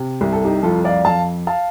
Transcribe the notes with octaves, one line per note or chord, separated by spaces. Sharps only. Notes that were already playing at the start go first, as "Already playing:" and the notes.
Already playing: C3
C2 G4
A4
D#4 G4
F2 F4 A4
D5 F5
F2 F5 A5
F5 A5